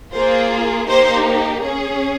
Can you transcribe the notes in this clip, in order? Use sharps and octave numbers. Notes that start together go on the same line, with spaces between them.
A#3 F4 G#4 C5
A#3 D#4 G4 C5
C#4 G#4